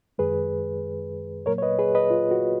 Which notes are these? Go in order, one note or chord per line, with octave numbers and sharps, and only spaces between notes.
F#2 D#3 G#3 G#4 B4
A#2 F#3 A#3 A#4 C#5
C#5
B4 D#5
G#4 B4
B4 D#5
F4
F#4